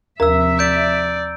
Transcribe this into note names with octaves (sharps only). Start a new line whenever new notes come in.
D#2 C3 F3 A#4 E5 A#5 E6
D5 G6 D7